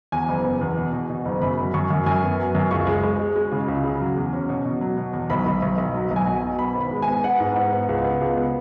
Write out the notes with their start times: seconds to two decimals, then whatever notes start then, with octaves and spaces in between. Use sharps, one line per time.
0.12 E2 G#5
0.28 F#1
0.45 B3
0.61 E2
0.77 B2
0.93 B2
1.10 B2
1.25 F#1
1.42 F#2 B5
1.58 F#3
1.74 F#2 C#6
1.91 F#2
2.06 F#2 G#5
2.23 B3
2.39 F#3
2.55 F#2
2.71 C#2 C#6
2.87 G#3
3.03 G#3
3.19 G#3
3.36 G#3
3.52 C#3
3.68 C#2
3.84 C#3
4.01 F#3
4.17 E2
4.33 C#4
4.49 B2
4.65 B2
4.81 F#3
4.97 B2
5.13 E2
5.30 B1 B5
5.46 B1
5.62 B1
5.78 B1
5.94 F#3
6.11 B1
6.16 G#5
6.27 B2
6.43 B2
6.59 B3 B5
6.75 G#1
6.81 B5
6.91 G#3
7.02 G#5
7.08 B3
7.24 B3 F#5
7.40 G#2
7.56 G#2
7.73 B3
7.89 C#2
8.05 B3
8.21 C#2
8.37 B3